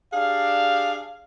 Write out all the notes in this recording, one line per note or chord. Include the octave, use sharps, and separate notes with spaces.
D4 G4 G#4 F5